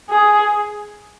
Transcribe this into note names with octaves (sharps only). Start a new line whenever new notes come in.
G#4